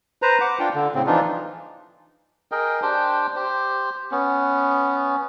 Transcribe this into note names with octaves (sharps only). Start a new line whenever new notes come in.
B4 C5 A#5
F#5 D6
D4 F4 G5
D3
A2 C#3 C4
E3 F3 D4 D#4 F4
G#4 A#4 D#5 G5
D4 G4 C5 G5
G4 C5
B3 C#4